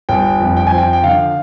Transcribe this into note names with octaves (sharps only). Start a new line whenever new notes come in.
G1 G5
F2
G5
G#5
F3
G5
G5
D3 F5